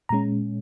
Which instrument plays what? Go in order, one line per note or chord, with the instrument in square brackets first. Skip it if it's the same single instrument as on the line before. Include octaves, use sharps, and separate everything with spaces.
[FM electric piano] A#2 G#3 C#4 A#5